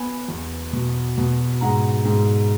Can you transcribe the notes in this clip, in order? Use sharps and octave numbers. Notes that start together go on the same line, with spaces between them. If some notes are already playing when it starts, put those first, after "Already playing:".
Already playing: B3 G#5 B5
E2
B2
B2
G#2 F#5 A#5
G#2